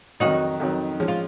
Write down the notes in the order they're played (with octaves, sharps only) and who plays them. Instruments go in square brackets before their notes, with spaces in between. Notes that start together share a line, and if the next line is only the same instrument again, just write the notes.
[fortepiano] F2 D#3 F#3 [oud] D#4 F#4
[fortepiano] F2 D#3 F#3
F3 G#3 C#4
[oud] F4